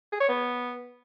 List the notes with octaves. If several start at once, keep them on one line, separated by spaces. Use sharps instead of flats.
G#4
C#5
B3